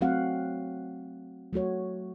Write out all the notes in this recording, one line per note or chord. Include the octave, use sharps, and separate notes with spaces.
F#3 A3 C4 F#4 F5 F#5
F#3 A3 F#4 C#5